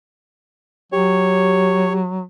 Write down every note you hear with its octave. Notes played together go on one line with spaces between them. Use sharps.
F#3 G4 C#5